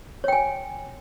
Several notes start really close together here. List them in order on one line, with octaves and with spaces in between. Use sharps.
C#5 G5 G#5